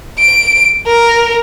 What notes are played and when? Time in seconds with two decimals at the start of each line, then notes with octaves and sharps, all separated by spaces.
0.19 D7
0.86 A#4